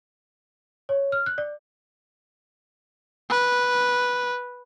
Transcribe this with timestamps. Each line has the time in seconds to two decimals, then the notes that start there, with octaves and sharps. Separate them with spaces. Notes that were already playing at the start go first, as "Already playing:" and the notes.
0.89 C#5
1.12 F6
1.26 F#6
1.38 D5
3.30 B4